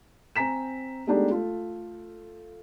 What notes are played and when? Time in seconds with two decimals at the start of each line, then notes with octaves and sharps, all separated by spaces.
0.36 C4 G#5 A#5 B6 E7
1.07 G#3 A3 B3 D4 D#4 G4
1.30 A3 F4 A4